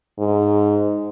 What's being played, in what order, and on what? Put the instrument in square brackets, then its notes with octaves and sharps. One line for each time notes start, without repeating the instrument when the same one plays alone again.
[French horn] G#2